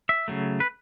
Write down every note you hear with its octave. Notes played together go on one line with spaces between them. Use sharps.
E5
C#3 F#3 A3
B4